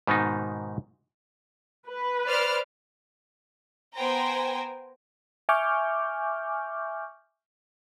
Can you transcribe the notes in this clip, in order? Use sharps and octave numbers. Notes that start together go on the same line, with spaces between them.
G#2 B2 D#3 B3 C4 D#4
B4
C5 D5 F6
B3 C5 G5 G#5 A#5
E5 G#5 C#6 D6 F6 G6